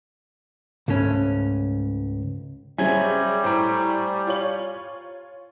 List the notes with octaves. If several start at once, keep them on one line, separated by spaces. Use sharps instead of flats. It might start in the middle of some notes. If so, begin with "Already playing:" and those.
C#2 G#2 A3 C#4
C#3 F#3 G3 C5 C#5 E5 G#5 G#6
A2 C5 A#5
F4 C#5 F#7